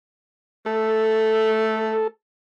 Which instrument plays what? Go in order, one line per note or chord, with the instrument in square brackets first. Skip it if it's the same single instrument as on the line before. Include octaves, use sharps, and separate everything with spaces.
[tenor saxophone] A3 [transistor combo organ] A4